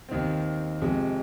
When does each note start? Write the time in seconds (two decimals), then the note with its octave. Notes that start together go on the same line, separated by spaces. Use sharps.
0.09 D#2 D#3 C4
0.82 F2 C3 G#3